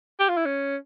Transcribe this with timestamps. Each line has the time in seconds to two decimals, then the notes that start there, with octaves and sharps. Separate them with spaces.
0.20 G4
0.28 F4
0.37 E4
0.46 C#4